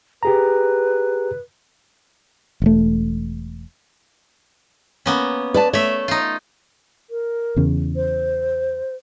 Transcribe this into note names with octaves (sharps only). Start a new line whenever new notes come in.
G4 G#4 B4 A#5
E1 A3
A#3 B3 C#4
B4 D5 A5
A3 C#5 E5
D#4 F4
A#4
E2 C#3
C5